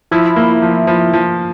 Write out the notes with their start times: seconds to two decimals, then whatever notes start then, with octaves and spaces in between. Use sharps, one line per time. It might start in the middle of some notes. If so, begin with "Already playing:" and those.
0.11 F3 E4
0.36 A#3
0.62 F3
0.87 F3
1.13 F3